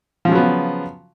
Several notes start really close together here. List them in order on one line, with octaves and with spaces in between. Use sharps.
F3 C#3 F#3 B3